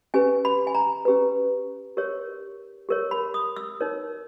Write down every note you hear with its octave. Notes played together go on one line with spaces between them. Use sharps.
C#4 G4 B4 G#5
B5
G#5
A#5
C#4 G4 B4
G4 A#4 C#5
G4 A#4 C#5
B5
D#6
E6
D#4 A#4 C#5